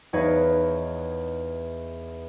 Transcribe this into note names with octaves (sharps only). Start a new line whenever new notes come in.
E2 D#4 B4 C#5 F5